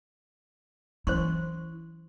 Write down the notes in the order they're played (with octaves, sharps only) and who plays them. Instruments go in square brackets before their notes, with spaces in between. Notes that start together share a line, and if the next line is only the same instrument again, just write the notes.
[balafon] E3 F#3 C#4 [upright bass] E4 [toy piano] C5 C6 C#6